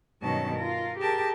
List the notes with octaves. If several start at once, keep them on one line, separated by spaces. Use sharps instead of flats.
G2 B2 D#3 F#3 C#4 A5
F4 A#4
G4 G#4 A#4 A5